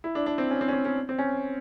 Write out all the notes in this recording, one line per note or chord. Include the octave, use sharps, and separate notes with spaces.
E4
D4
D4
C4
C#4
C4
C#4
C4
C#4
C4
C#4